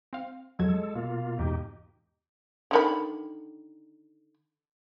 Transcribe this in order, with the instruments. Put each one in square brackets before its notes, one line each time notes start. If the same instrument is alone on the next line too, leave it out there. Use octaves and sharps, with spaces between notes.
[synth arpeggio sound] C4 F5
[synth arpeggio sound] F2 F#3 G#6 [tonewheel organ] G#3 A4
[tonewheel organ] B2 A#3 F4
[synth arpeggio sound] E2 G#2 [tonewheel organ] B2 D#4 G4
[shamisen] D3 D#3 B5